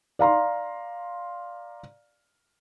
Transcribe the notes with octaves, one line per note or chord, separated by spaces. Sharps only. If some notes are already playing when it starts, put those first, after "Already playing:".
D5 F5 A#5 C6